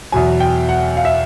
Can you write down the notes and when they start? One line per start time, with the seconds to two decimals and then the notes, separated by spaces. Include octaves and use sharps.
0.12 E2 B2 F#3 G#5
0.40 G5
0.69 F#5
0.97 F5
1.05 E5